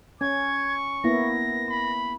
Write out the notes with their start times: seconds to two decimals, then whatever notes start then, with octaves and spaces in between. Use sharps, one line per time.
0.21 C#4 C#6 G#6
1.04 A#3 B3 E4 A#6
1.69 B5